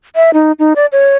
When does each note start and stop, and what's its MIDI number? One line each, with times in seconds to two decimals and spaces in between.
0.16 0.30 76
0.34 0.52 63
0.59 0.73 63
0.76 0.86 74
0.92 1.17 73